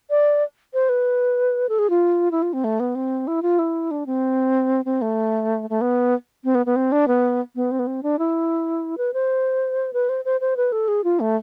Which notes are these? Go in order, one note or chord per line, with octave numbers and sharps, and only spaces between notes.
D5
C5
B4
A4
G#4
F4
E4
F4
C4
A3
B3
C4
E4
F4
E4
D4
C4
C4
A3
A3
B3
C4
B3
B3
C4
D4
B3
B3
C4
B3
C4
D4
E4
B4
C5
B4
C5
C5
C5
B4
A4
G#4
F4
A3